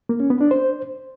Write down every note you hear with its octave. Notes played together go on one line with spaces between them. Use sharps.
A#3
C#4
B3
D4
C5